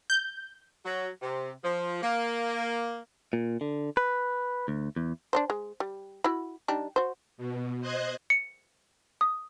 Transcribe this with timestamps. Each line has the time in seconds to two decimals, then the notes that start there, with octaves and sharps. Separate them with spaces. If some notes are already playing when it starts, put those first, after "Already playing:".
0.10 G6
0.85 F#3
1.22 C3
1.64 F3
2.02 A#3
3.33 A#2
3.61 D3
3.97 B4
4.68 D2
4.96 E2
5.33 D4 D#4 C5
5.50 G#3
5.80 G3
6.24 E4 F#4 B5
6.68 G3 D4 D#4
6.96 F#4 C5
7.37 B2
7.81 C5 D#5 F#6 G#6
8.30 C#7
9.21 D#6